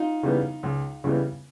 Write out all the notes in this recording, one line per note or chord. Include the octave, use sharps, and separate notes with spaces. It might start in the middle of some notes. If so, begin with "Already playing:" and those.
Already playing: D#4 F4
C#3 E3 G3 B3
C#2
C#3 E3 G3 B3